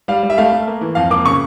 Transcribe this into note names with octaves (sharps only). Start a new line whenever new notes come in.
G3 F5
G3
E5
A3 F5
A3
A#3
E3
F2 F5
A#3 D6
C#3 C#6